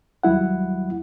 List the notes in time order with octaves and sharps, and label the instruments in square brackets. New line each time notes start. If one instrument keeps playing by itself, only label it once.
[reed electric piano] D#2 F#3 G3 E4 F#5